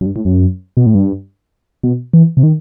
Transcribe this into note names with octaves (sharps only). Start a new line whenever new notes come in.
F#2
G2
A2
F#2
B2
A2
G2
B2
E3
C3
D#3